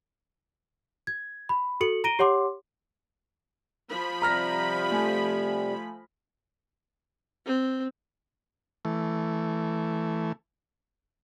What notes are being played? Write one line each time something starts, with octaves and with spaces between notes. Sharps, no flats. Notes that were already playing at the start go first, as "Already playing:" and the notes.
G#6
B5
F#4 A4 C#7 F#7
A#5 A#6 D7 D#7 G7
G4 C#5 F#5 C6 D6
F3 B5
C3 G3 A#5 F6 A#6
A3 G#5
C4
E3 A3